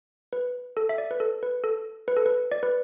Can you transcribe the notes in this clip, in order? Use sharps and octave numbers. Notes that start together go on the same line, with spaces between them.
B4
A4
E5
D5
B4
A4
B4
A4
B4
A4
B4
D5
B4